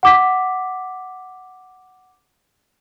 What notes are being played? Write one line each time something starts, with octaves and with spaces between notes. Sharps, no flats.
F#5 D6 B6